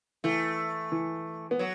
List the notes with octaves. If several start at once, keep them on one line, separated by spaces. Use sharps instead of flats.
E3 A3
E3
B3
F#3